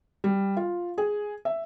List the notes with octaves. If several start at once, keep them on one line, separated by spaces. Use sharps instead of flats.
G3
F4
G#4
E5